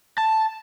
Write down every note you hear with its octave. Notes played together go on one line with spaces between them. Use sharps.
A5